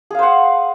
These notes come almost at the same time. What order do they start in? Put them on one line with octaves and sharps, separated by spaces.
G#4 F5 C5 F#5